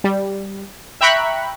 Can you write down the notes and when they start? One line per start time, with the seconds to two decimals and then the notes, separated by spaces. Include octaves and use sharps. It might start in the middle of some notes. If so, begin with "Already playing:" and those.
0.04 G3
1.01 E5 G5 A#5 B5 C#6 F#6